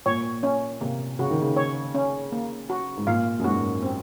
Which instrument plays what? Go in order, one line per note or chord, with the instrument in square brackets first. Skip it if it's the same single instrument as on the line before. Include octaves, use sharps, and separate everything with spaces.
[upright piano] A#2 [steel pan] C#5
[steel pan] C#4
[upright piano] C3 [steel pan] A#3
[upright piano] C#3 [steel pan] F#4
[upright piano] D#3
C#3
[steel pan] C#5
C#4
A#3
F#4
[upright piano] G#2
[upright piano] A#2 [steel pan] F5
[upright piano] F#2
[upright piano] G#2 [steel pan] F#4
[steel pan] C4